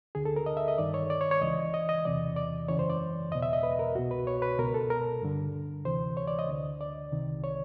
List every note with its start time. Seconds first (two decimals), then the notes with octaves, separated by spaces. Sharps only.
0.15 D2 D3 G#4
0.25 A4
0.36 A#4
0.46 D#5
0.57 E5
0.68 D#5
0.78 G2 D#3 D5
0.94 C#5
1.10 D5
1.21 C#5
1.31 C#5
1.41 C#2 C#3 E3 D#5
1.74 D#5
1.89 D#5
2.05 E2 C3 E3 D5
2.36 D5
2.68 F#2 C#3 E3 C#5
2.79 C5
2.90 D5
3.31 E2 D#5
3.35 B2
3.42 E5
3.53 D#5
3.63 B4
3.79 A#4
3.95 C2 B2 F#4
4.11 B4
4.27 C#5
4.42 B4
4.58 C#2 B2 A#4
4.74 A4
4.90 A#4
5.22 G2 D3
5.85 D2 C3 E3 C5
6.17 C#5
6.27 D5
6.39 D#5
6.49 D2 D3
6.81 D5
7.12 C2 C3 D#3
7.44 C#5